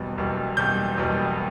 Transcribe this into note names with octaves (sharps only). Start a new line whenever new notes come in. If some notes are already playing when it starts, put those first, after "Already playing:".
Already playing: F#1 E2 B2 G3
F#1 E2 B2 G3
F#1 E2 B2 G3 G6
F#1 E2 B2 G3